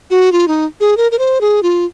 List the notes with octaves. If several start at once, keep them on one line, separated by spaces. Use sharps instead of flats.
F#4
F4
D#4
G#4
A#4
A#4
C5
G#4
F4